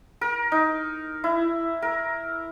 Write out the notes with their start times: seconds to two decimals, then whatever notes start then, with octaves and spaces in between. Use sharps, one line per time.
0.21 A#4
0.52 D#4
1.24 E4
1.82 A#4